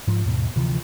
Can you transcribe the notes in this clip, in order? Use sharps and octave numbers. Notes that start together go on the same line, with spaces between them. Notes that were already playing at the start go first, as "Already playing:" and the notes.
G#2 F3
D#2 G#2 B2
D2 C3 E3 F3